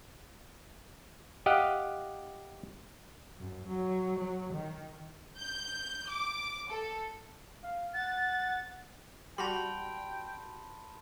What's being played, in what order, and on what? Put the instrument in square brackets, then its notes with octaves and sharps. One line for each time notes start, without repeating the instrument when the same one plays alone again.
[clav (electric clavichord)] G4 D#5 F5 F#5
[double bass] F#2
F#3
F#3
D#3
[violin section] G6
D6
A4
[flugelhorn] F5
[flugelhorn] F#5 [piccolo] A6
[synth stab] G3 F#4 [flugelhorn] G5 [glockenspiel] A5 B5 C6